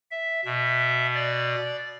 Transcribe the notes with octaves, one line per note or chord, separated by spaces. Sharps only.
E5
B2 E5
D5